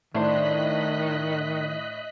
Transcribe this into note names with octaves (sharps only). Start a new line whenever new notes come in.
A2 D#3 D4 C5 D#5 F#6 B6